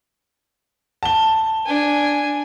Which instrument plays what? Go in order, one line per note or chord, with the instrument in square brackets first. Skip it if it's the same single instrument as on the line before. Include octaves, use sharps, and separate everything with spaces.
[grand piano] A5 G7
[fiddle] D4 G#5